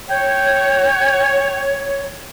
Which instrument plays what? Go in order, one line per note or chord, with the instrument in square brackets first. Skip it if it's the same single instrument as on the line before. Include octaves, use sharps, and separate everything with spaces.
[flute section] C#5 [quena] G5